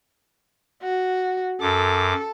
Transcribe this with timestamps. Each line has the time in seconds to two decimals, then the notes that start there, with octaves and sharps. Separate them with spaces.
0.83 F#4
1.61 F#2 A4 D6